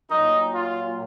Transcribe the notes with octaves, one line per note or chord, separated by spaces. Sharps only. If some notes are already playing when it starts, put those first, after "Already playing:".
A#2 F#3 D#4
F4